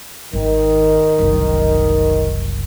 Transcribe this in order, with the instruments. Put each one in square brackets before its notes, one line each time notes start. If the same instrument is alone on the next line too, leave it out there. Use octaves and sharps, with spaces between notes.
[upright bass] G#1 [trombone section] D#3
[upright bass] F#1 C2